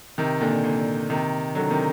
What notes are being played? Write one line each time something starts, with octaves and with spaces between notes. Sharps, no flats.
C3 D#3
A#2 D3
A#2 D3
C3 D#3
D3 F#3
C3 D#3